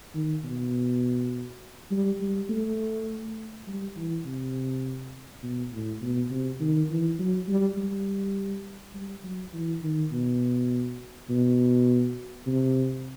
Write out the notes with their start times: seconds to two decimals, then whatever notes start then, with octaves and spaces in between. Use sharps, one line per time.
0.14 D#3
0.44 B2
1.91 G3
2.21 G3
2.49 A3
3.67 G3
3.96 E3
4.26 C3
5.43 B2
5.72 A2
6.02 B2
6.31 C3
6.60 D#3
6.90 E3
7.19 F#3
7.48 G3
7.77 G3
8.94 G3
9.24 F#3
9.53 E3
9.83 D#3
10.12 B2
11.30 B2
12.47 C3